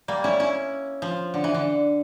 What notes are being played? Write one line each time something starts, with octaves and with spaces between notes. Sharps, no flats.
G3 A#3
C#4 E4
C#4 E4
F3
D3
E3
D3